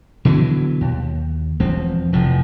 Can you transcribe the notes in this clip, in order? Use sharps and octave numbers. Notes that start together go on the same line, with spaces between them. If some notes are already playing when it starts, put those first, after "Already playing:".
B2 D3 E3 F#3
D#2
E1 F3 C4
F1 A2 F3